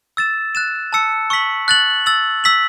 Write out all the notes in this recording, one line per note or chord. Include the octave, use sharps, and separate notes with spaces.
E6 A6 E7
F#6 A6 E7
A5 E6 C#7
C#6 E6 B6 F#7
F#6 A6 F#7
E6 A6 F#7
E6 B6 F#7